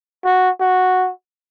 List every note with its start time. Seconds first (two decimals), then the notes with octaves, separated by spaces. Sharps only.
0.24 F#4
0.60 F#4